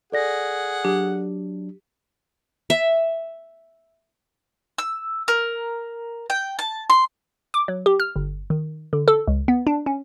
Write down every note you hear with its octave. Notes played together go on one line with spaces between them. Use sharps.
G#4 A4 D5 F#5 A#6
F#3 D4 G4
E5
E6
A#4
G5
A5
C6
D6
F#3
G4
F6
G1
D#3
D3
A4
C#2
B3
D4
C#4